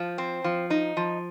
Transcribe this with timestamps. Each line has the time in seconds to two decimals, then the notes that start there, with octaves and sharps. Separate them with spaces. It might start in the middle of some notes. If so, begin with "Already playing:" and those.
Already playing: F3
0.18 C4
0.44 F3
0.70 D#4
0.97 F3